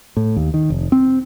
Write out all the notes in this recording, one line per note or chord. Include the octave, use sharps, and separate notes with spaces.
A2
D#2
D#3
F1
C4